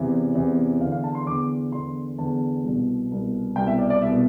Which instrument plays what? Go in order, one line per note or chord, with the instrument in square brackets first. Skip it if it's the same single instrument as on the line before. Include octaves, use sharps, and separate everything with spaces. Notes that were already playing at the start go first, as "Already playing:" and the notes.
Already playing: [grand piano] E2 C3 E3
E2 C3 E3
E2 F5
D3
F5
A5
C6
E2 D3 D6
E2 D3 C6
E2 D3 A5
C2 B2
C2 B2
C2 B2 G5
E5
D5
D5
C2 B2 E5